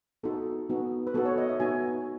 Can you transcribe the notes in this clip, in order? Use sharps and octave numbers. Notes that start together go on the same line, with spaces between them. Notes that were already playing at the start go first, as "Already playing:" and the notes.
B3 D#4 F#4 A4
B3 D#4 F#4
B4
B3 D#4 F#4 A4
C#5
D#5
E5
B3 D#4 F#4 G#5